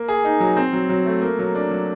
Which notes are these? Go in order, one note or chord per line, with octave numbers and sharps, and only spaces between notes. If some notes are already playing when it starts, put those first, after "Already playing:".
Already playing: A#3
G#4
D#4
F#3
C4
F#3
F#3
A3
A#3
F#3
D4
F#3